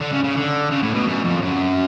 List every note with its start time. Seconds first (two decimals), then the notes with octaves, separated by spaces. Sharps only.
0.01 D3
0.12 C#3
0.24 C#3
0.36 D3
0.71 C#3
0.82 A2
0.94 B2
1.06 F#2
1.24 F2
1.41 F#2